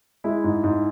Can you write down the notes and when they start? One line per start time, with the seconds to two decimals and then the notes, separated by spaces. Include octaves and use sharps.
0.24 G#3 E4
0.44 G#2
0.64 G#2